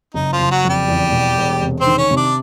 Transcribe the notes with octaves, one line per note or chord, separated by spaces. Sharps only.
F#1 D#4
F3 F4
F#1
F#3 F#4
F2
G3 G4
E2
B2
E1
C3
C4 C5
D#3
C#4 C#5
C3
D4 D5